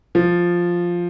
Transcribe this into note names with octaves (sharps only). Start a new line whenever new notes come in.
F3